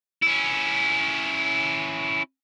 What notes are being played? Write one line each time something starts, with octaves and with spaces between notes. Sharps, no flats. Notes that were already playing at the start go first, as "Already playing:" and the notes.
C#4 E4